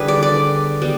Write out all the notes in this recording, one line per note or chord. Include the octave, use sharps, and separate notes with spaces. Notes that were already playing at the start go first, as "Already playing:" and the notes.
Already playing: D3 G3 B3 G#4 B4
D5
D5
G3 B3